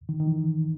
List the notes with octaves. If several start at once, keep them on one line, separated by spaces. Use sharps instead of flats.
D#3
D#3
E3